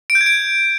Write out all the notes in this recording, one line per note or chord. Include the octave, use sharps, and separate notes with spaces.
D7
G6
G#6
D7